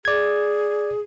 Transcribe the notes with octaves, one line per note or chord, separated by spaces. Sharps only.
G#4 D5 G#6